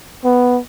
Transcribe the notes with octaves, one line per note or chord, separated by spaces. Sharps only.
B3